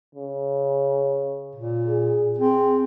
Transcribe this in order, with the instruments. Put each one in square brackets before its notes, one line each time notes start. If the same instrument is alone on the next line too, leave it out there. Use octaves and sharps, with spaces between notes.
[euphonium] C#3
[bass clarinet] A#2
[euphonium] G#4
[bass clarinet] C4 [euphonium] G#4